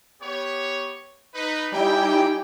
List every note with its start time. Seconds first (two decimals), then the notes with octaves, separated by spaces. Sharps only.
0.20 B3 G4 C#5
1.33 D#4 B4
1.72 G3 D#4 E4 G4 G5 G#5